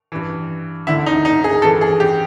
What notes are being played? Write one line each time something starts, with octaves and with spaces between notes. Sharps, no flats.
G2 E3
D2 D3 E4
D#4
D#4
G#4
G2 E3 A4
G#4
G4